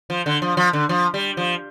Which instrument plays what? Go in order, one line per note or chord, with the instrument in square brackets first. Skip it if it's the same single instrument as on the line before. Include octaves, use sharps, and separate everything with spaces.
[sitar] F3
D3
F3
F3
D3
F3
G3
F3